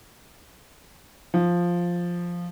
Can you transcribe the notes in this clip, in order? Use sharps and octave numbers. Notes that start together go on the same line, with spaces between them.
F3